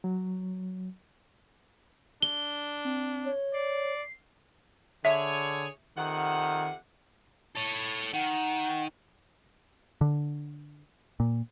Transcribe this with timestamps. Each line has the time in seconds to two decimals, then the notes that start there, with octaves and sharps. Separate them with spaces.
0.04 F#3
2.22 D4 G7
2.85 C4
3.25 C#5
3.54 D5 C7
5.05 D3 G#4 C#5 E5
5.97 F2 C3 D#3 F#5
7.55 A4 C#5
8.13 D#3 F#5
10.01 D3
11.20 A#2